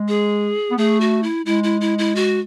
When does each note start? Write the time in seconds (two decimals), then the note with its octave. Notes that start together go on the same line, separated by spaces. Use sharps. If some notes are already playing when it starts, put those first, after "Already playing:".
Already playing: G#3
0.08 G#4
0.71 B3
0.78 A3 G#4
1.01 F#4
1.23 E4
1.46 G#3 E4
1.64 E4
1.81 E4
1.99 E4
2.15 F#4